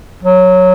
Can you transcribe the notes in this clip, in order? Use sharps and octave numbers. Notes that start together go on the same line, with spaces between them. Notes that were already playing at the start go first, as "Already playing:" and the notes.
F#3